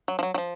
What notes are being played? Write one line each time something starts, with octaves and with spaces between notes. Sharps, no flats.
F#3
F3
F#3
F#3
F3